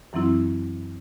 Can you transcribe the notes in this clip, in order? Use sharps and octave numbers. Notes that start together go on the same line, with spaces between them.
F#2 E3 F#3 C4 E4